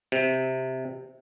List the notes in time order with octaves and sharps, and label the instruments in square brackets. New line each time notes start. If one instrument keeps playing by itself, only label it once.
[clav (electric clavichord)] C3